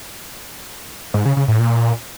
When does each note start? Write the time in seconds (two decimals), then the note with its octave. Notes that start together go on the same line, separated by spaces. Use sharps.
1.14 G#2
1.25 C#3
1.37 C#3
1.48 A2
1.59 A#2